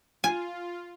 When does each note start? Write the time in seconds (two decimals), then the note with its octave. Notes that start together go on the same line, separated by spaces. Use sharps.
0.24 F4 G#5